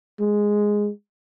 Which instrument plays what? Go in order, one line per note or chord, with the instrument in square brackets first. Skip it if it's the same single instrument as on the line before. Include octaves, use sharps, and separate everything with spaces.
[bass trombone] G#3